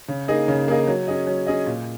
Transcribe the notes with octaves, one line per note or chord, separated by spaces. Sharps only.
C#3
A#3 D#4 G#4 D#5
C#3
A#3 D#4 G#4 D#5
F#3
C#4 G#4 D#5
F#3
C#4 G#4 D#5
A#2